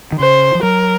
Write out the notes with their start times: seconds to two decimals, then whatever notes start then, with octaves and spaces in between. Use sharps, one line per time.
0.12 D#3
0.20 C#3 C5
0.55 F3
0.63 F#3 A#4